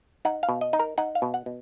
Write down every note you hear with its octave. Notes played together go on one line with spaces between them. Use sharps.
D#4 F#5
F5
B2
D#5
D#4
A#4
D#4 F#5
F5
B2
F#5
B2